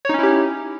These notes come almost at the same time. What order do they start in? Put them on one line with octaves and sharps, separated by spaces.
C#5 D#4 C#4 E4 G4